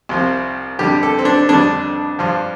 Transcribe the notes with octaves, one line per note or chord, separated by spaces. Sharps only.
C2 C3 F3
F2 D3 G3 G4
A4
C4
D4
F2 D3 G3 D4
G2 F3